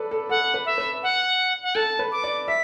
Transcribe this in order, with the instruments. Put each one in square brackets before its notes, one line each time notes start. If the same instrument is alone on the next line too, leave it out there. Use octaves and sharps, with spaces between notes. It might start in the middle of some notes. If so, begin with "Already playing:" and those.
Already playing: [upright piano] A4 B4 D5
A4
[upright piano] A4 [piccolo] F#5
[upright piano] B4
[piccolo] E5
[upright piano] B4
[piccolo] F#5
F#5
[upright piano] A4 [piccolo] A5
[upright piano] B4
[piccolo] D6
[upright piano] D5
[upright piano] E5 [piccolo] B6